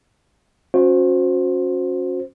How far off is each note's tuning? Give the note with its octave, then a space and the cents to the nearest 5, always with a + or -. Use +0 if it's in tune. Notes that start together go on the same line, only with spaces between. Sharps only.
C#4 -10 F#4 -25 C5 +0